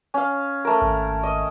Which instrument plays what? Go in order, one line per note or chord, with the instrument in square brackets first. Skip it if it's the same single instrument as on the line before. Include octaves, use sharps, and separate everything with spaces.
[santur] C#4 F5
A3 A#4
[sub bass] G#1
[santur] D#5